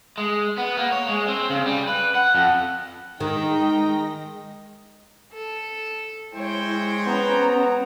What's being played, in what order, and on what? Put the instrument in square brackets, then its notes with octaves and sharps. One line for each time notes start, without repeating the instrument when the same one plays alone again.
[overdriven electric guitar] G#3
B3
A#3
C#5
G#3
C4
C#3
G3
B4
F#5
F2
[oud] D#3 [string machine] G#3 A#6 [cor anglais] D#4 [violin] G5
[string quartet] A4
[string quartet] G#3 C#5 [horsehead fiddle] E4 [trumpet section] C5 G5
[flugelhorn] B3 [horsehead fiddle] C#4 A#5